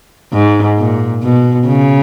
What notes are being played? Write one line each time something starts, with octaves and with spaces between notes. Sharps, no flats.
G#2
A#2
B2
C#3